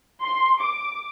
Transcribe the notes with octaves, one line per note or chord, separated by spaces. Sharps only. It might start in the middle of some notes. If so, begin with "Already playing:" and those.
C6
D6